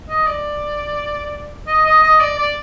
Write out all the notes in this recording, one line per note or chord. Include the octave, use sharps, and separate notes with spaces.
D#5
D5
D#5
D#5
D#5
D5
D5